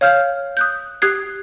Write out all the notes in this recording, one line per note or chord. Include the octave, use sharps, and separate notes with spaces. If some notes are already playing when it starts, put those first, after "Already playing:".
C#5 F5 F6 G6
D#6 F#6 G6
G4 D#6 F#6 G#6 C7